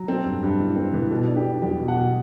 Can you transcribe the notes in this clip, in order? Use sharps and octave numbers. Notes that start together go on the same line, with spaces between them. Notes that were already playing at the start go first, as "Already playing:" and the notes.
Already playing: F#3
C4 A4
G2
G2
E3
C4
E3
B2 A4
D4
G4
D4
E2 G4
B2
F#5
B2